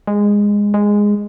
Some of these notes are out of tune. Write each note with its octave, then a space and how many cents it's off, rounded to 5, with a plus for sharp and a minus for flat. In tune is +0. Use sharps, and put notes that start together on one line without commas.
G#3 -15
G#3 -10